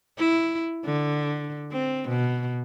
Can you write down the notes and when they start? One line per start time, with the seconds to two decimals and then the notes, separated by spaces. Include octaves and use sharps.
0.18 E4
0.85 D3
1.72 C4
2.09 B2